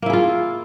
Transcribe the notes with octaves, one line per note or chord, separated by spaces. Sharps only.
A#3 E4 F4 G#4